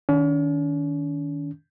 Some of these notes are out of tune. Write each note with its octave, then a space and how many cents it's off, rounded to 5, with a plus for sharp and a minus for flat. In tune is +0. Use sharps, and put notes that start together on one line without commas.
D#3 +0 C#4 +45